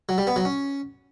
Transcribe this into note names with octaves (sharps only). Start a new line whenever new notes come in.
F#3
G3
B3
F#3
C#4